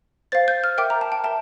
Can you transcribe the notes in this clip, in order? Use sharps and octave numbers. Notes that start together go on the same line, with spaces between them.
C5 F5 A6
G6
F6
A#4 E5 G5 D6
A#5
A5
G5
A#4 E5 G5 A5